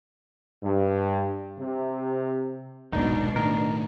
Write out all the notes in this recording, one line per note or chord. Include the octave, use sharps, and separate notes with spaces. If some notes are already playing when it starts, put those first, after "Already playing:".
G2
C3
D#1 B1 G#2 B2 D4 D#4
A2 D#3 A#4